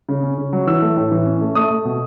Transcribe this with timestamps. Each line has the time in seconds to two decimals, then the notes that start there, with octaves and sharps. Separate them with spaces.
0.09 C#3
0.23 C#4
0.38 C#3
0.53 F#3
0.67 E3 E6
0.82 A3
0.97 A2
1.11 E3
1.26 C#4
1.41 A3
1.55 A3 D#6
1.71 A3
1.85 B2